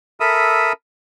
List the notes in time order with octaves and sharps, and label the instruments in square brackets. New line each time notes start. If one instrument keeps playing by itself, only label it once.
[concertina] A4 A#4 E5 B5 D#6 E6